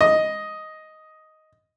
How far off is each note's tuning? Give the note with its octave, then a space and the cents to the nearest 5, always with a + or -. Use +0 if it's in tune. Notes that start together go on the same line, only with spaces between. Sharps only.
D#5 +5